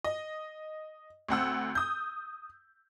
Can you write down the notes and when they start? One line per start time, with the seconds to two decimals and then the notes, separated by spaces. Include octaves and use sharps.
0.04 D#5
1.29 D2 C4 F#5 E6
1.75 D#6 G6